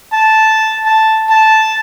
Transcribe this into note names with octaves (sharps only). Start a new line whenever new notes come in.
A5
A5
A5